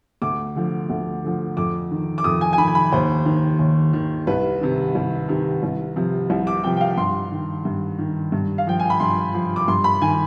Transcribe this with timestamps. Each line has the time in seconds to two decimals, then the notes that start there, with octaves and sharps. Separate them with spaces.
0.22 D2 D6
0.55 D3 F3
0.90 D2
1.24 D3 F3
1.57 F2 D6
1.91 D#3
2.18 D6
2.24 F2 D#6
2.41 G#5
2.53 G#5
2.58 D#3 B5
2.68 G#5
2.75 B5
2.92 D#2 C5
3.26 D#3
3.59 D#2
3.93 D#3
4.27 C2 B4
4.61 C3 D#3
4.95 C2
5.29 C3 D#3
5.63 C2
5.96 C3 F3
6.30 C2
6.47 D6
6.63 C3 F3 G5
6.77 G5
6.81 F5
6.97 G2 C6
7.32 D#3
7.65 G2
7.99 D#3
8.32 G2
8.58 F5
8.67 F3 G5
8.80 G#5
8.90 B5
9.00 G2 C6
9.34 F3
9.56 D6
9.68 G2 C6
9.84 B5
10.02 D#3 G#5